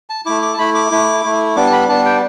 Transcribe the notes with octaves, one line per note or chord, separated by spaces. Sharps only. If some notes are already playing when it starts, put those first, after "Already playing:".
A5
A3 E4 D6
D6
A5
A3 E4 B5
D6
A3 E4
A3 E4
G3 B3 D4 D6
A5
B5
G3 B3 D4 A5
G5